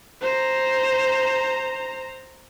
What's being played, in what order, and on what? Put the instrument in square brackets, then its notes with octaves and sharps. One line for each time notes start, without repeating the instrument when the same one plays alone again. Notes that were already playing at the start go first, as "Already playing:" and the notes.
[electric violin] C5 A#5